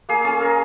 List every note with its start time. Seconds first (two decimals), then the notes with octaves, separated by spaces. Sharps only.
0.09 A#3 G#4
0.24 C#4 G#4
0.40 C#4 A#4